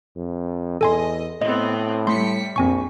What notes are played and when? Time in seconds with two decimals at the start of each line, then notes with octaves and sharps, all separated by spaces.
0.16 F2
0.81 E2 A4 D#5 G#5 C6
1.42 A2 B3 C4 D#5
2.07 G3 A3 C6 B6 C#7
2.56 A#1 F2 C4 G#5 C#6